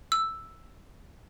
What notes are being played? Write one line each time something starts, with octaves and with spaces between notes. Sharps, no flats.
E6